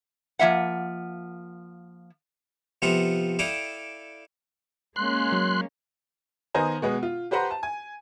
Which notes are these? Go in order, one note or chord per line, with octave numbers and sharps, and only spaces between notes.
F3 A#3 E5 F#5
C3 F3 B3 F4 A4 F#5
E4 A4 D5 F5 G5 D#6
G#3 A#3 C#4 C6 F#6
F#3
D#3 B3 C5 D#5 G#5 A#5
B2 G#3 B3
F4
G4 B4 C5 F#5 A#5 C6
A5
G#5